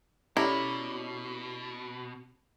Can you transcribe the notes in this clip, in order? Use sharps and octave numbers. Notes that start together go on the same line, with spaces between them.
B2 C#4 E4 G4 A4 C#5 D5 A#5